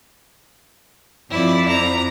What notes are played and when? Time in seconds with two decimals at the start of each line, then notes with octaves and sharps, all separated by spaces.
1.30 F2 E4 D5
1.69 A#5